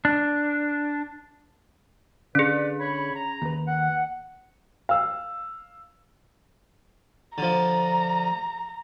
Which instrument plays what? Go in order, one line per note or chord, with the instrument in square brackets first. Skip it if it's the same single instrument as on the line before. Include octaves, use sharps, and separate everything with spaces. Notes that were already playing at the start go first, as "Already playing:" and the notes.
[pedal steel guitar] D4
[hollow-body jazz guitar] D3 [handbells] C#4 G#4 [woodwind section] B4 D5
[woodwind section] C#5 B5
A#5
[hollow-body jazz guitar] D#2 B4
[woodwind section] F#5
[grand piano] F5 E6
[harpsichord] D3 F3 [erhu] A#5